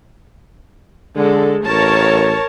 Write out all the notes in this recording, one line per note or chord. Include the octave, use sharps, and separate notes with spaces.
D3 G#3 A4
A1 A#4 C#5 A5